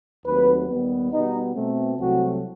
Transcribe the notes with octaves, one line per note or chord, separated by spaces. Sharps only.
D#2 D#3 F#3 A3 C4 B4
D#2 D#3 G3 B3
B2 G3 B3 D#4
B2 A3 C4
C2 C3 F#3 A3 C4 F#4